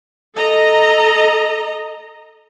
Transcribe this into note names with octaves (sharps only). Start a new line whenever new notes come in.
A4 D#5 A#5